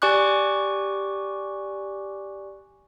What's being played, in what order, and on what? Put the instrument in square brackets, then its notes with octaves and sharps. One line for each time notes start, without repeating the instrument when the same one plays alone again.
[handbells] G4 D5 G#5 C#6 D6 F#6